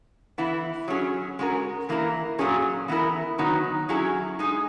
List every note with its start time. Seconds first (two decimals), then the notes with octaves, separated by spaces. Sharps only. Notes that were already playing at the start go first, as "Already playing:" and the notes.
0.38 E3 B3 E4
0.88 F#3 C#4 G#4
1.39 G#3 C#4 F#4 A#4
1.89 E3 A#3 E4 A#4
2.39 A#2 F#3 C#4 G#4
2.88 E3 B3 E4 A#4
3.38 D#3 F#3 B3 D#4
3.89 F#3 C#4 E4 G#4
4.39 G#3 D#4 G#4